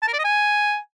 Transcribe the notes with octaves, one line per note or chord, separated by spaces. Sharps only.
A5
A#4
D5
D#5
G#5